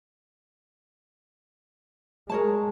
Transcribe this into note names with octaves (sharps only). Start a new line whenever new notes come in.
G#3 A#4 C#5 A5